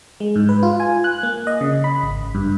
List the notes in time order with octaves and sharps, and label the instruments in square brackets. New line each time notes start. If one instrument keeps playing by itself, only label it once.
[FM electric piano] G#3
G#2
B4
F4
G#5
F#6
A#3
D#5
C#3
B5
G#1
G2